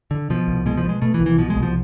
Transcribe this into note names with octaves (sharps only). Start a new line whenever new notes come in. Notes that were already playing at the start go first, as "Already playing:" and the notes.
D3
B2 F3
C2
B2 G#3
F3
B2
G#3
B2 A3
E3
C2
E3
B2 F3
G#3
C2
F3